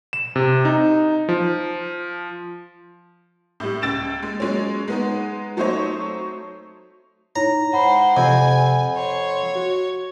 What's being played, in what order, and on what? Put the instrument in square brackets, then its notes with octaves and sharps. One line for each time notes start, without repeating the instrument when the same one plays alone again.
[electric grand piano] E7
C3
D#4
F3
[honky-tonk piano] A2 G3
C#2 E6 A6 D7 E7
G#3
F#3 G#3 C#4
G#3 B3 D#4
F#3 A3 C4 D#4 C5 C#5
[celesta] D#4 E4 C#5 [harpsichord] A#5
[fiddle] G#3 C5 [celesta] F#5 B5
[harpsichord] F2 [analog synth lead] C3 [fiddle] G#5
[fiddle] C#5 [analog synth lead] C6
[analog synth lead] F#4